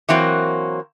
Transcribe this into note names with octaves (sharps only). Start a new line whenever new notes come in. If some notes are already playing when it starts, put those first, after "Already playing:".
E3 F#3 A#3 C4 F#4